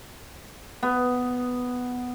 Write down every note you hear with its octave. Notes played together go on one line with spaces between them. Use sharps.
B3